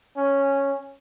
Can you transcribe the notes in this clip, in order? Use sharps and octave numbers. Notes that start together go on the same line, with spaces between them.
C#4